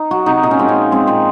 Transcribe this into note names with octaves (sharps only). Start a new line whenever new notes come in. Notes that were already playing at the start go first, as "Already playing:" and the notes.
Already playing: D#4
F#3 F#4
C3 D#4
A#2 D#4
C#4
G#3 C4
C#4
F3
G#3 C4
A#2 C4